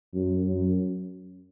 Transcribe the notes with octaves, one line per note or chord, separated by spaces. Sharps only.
F#2
F#2